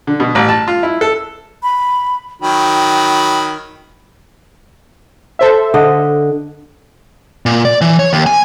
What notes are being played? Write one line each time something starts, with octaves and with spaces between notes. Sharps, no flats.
D3
B2
A1
A5
F4
E4
A4
B5
D#3 F#3 G5 B5
A4 C5 E5
D3 D#5
A#2
D5
E3
C#5
D#2
G#5